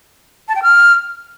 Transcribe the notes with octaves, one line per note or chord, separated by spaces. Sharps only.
A5
G5
F6